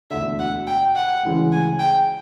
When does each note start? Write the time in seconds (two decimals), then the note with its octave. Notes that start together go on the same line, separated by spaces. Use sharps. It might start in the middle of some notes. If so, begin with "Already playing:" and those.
0.10 E1 D2 D3 E5
0.39 F#5
0.67 G5
0.96 F#5
1.23 D2 C#3 E3 G#3 C#4
1.52 G#5
1.79 G5